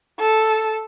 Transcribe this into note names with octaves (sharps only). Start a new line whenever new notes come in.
A4